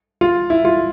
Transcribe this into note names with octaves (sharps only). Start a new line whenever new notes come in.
F4
E4
F4